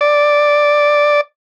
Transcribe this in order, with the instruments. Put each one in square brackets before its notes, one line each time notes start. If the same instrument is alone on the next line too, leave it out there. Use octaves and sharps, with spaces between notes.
[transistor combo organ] D5